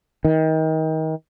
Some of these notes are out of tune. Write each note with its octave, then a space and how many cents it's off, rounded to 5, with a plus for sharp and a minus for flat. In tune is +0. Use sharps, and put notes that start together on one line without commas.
D#3 +30